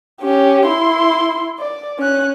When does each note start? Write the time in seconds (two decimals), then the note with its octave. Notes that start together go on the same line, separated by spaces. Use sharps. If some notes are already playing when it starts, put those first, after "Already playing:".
0.21 C#4 G4
0.66 E4 C6
1.59 D5
1.99 C#4 F#6